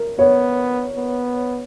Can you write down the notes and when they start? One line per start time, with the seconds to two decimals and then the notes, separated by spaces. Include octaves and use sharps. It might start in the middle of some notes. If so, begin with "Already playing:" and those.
Already playing: A#4
0.18 B3 C#5
0.95 B3